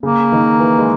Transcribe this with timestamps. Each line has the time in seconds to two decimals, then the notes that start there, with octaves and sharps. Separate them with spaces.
0.03 C#3 A#3
0.32 D#3
0.59 E3
0.79 G#3